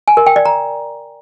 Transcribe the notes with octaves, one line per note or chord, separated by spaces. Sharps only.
G#5
A#4
G5
D5
A#5